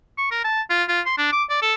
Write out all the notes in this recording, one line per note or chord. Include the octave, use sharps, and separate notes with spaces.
C#6
A#4
A5
F4
F4
C6
D4
D6
D5
A4